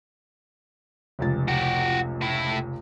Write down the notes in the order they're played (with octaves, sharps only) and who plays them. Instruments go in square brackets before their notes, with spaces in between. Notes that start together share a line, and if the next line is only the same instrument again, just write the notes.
[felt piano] F1 C#2 A6
[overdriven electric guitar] F#4 G4
A2 E4